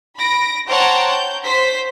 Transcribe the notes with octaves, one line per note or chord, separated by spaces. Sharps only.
B5 A#6 D7
C5 C#5 F#5 G5 A5 A#5
G6
C5 B6